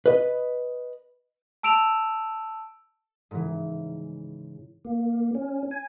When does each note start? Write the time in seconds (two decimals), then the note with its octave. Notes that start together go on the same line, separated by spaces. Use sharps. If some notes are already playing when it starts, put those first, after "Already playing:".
0.06 B4 D#5
1.63 A5 E6 D7 E7 F7
3.31 G#2 C#3 E3
4.85 A#3
5.35 C#4
5.71 G#5